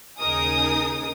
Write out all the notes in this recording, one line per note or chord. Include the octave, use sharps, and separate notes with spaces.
D#2 C#3 D#4 G#4 A#4 D#6